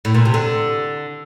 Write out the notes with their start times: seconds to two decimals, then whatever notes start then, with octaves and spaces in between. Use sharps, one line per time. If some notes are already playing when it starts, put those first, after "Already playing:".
0.05 A2
0.14 A#2
0.25 C3
0.34 D3